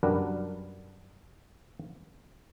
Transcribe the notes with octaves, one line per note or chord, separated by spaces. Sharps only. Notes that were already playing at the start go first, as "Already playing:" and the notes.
F#2 G3 D4 A#4 B4 F#5